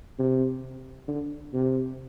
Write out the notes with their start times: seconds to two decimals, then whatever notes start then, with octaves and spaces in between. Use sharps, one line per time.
0.19 C3
1.08 D3
1.53 C3